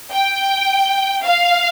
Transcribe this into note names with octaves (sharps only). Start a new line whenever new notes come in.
G5
F5